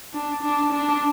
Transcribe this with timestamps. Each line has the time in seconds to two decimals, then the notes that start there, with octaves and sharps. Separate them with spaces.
0.14 D4
0.43 D4
0.73 D4